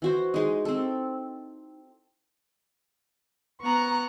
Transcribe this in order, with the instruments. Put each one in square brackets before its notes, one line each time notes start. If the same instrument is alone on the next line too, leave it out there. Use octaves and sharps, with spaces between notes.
[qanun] E3 F#4 C5
G#3 D#4
C4 A4
[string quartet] B3 F#6 [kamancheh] A#5 C#6